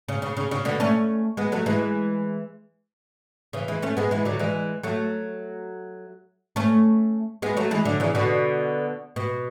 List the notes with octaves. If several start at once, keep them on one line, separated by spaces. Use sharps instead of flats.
C#3
C#3
C#3
C#3
B2 D3
A3 C#4
G#3 B3
F#3 A3
E3 G#3
C#3 E3
E3 G#3
A3 C#4
G#3 B3
E3 G#3
D3 F#3
E3 G#3
F#3 A3
A3 C#4
G#3 B3
F#3 A3
E3 G#3
D3 F#3
C#3 E3
B2 D3
B2